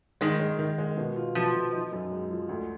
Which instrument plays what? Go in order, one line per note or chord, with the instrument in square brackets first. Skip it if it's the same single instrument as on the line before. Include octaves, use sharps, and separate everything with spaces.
[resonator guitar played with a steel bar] D#3 [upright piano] G#3
[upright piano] G#3
D#3
G#3
B2
F4
[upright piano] B2 [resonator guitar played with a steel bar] F3
[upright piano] B2
D#4
F#2
G#3
F3
D2